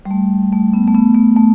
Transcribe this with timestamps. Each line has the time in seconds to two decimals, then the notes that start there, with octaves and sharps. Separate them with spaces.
0.05 G3
0.11 A3
0.53 A3
0.73 B3
0.87 A3
0.95 B3
1.15 A3
1.36 A3